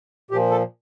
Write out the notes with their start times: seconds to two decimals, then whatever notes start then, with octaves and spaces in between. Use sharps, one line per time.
0.31 A#2 G4
0.34 F3
0.51 A4